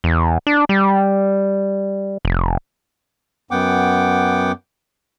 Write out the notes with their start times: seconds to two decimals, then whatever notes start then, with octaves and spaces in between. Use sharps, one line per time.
0.04 E2
0.47 D4
0.69 G3
2.25 F1
3.51 F#2 B3 F#5 G5 D6